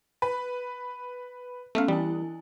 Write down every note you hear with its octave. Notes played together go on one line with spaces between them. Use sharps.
B4
A3 B3 C#4 E5 F5
E3 G3 E4 G#5